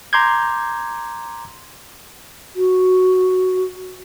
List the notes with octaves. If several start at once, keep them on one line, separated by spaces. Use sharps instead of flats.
A#5 C6 D6 G6 G#6
F#4